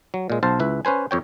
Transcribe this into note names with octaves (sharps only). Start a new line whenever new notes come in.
F#3
A#2 G#3
B1 C5 F5 A5
C#2 E4 B4
C#4 B4 C5 G#5
F2 C#5 G5